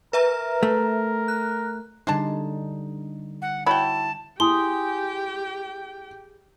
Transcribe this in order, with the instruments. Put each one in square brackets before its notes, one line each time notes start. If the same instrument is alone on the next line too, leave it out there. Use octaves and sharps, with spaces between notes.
[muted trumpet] A#4 [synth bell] B4 E5 A#5
[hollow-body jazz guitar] A3
[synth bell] F#6
[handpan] D3 G3 D#4 [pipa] G#3 D4 A5
[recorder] F#5
[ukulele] E4 C#5 B5 [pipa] F#4 G5 [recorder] A5
[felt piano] E4 [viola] G4 G5 [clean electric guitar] G#4 [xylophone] C6